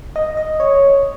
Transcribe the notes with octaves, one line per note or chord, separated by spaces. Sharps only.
D#5
D#5
C#5